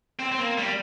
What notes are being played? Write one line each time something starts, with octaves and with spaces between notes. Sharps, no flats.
C4
C4
A#3
G3